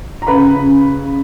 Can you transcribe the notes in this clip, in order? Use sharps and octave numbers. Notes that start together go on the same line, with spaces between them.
A#5
C#3 B4 B5
C#3